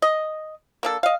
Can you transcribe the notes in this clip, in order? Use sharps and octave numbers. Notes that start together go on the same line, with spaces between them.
D#5
A#3 D4 A4
D#5 F5